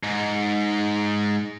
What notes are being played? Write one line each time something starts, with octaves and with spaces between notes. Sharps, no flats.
G#2 D#4